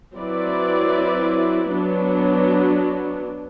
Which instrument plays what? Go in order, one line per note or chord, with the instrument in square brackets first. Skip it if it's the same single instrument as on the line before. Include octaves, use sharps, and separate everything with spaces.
[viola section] F#3 C4 E4 B4 D5
F#3 B3 D4